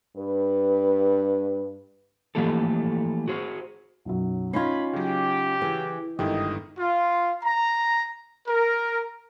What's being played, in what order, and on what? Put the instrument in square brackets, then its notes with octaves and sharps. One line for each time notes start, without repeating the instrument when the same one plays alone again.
[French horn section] G2 B4
[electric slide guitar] E3 F3 A3 A#3 G4 A4
F#4 G#4 C5
[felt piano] B1 F#2 F#3
[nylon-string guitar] C#4 D#4 F4 [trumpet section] B5 [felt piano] G#6 C7
[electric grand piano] C#3 F#3 [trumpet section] G4
[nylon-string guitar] E3 [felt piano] G#4
[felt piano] G1 A4 [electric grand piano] G#2 D#3 E4 [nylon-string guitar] G4 [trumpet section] D#5
[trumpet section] F4
A#5
A#4